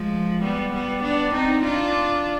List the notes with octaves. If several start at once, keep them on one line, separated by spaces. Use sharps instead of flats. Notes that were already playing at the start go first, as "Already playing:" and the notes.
Already playing: F3 G#3
G3 B3
G3 B3
B3 D4
C4 D#4
D4 F4